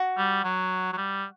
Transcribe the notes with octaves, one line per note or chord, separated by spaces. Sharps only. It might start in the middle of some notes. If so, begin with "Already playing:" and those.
Already playing: F#4
G3
F#3
F#3
G3